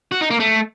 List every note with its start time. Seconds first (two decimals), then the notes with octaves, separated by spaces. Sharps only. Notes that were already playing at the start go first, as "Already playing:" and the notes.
0.12 F#4
0.21 D#4
0.30 A#3
0.40 A3